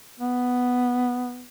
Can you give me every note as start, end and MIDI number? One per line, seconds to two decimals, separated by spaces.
0.20 1.45 59